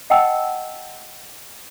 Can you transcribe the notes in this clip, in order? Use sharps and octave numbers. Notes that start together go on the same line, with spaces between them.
D#5 F#5 G5 A5 E6